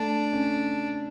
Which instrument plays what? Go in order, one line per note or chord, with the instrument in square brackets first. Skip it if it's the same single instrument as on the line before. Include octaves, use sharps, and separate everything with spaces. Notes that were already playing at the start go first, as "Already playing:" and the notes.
Already playing: [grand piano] A3 [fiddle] D4
[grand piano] C#4